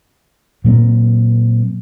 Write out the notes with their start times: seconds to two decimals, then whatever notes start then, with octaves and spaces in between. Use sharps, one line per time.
0.64 A#2 F#3 A#3 C4